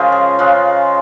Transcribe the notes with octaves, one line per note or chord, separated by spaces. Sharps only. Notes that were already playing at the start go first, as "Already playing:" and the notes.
Already playing: C#3 F3 G#3 F4 A#4
G#4
C#3 F3 G#3 F4